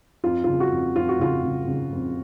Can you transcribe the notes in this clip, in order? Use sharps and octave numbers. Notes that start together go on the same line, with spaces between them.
F2 F4
F4
C#3
F#4
F2
F2 F4
F#4
C#3 F4
C#3
C#3
F2